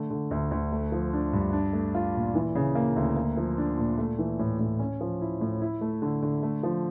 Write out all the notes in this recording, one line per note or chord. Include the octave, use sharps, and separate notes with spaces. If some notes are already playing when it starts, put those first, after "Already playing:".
Already playing: D3 A3
D3
D2
D2
A3
F3
D4
G2
D4
A3
F4
A#2
E3
C#3
A#3
D2
A#3
F3
D4
A#2
A3
E3
A2
A2
C#4
F3
E4
A2
E4
A3
D3
D3
A3
F3